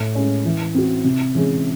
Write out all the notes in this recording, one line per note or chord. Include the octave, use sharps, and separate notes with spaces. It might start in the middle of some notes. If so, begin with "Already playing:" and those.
Already playing: A2
G#3 C#4
E3
C4 F#4
C3
E3 G#3 C#4 G#4